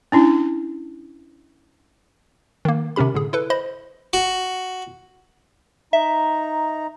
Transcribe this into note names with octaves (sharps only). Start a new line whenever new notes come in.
C#4 D4 E4
D#3 A#3
C3 D#3 C#4 G4 B5
A2 D3 G#4
E4 A4 B4
C5 D#5 B5
F#4
D#4 E5 A#5